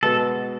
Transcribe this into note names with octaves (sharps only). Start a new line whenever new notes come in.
B2 G#3 B3 A4